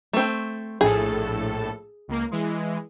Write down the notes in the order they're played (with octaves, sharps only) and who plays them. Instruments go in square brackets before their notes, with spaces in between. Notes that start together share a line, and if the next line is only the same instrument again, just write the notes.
[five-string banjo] A3 C4
[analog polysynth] A#1 A2 A4 [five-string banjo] G#4
[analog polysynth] C#2 A#3
E3 G#3